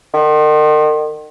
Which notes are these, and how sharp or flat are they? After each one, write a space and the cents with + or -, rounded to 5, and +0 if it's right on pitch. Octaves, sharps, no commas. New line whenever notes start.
D#3 -40